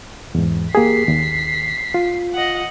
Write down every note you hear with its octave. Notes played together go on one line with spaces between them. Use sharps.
E2 G#2
A#3 G4 G#4 B6 C7
D#2
F4
D#5 F#5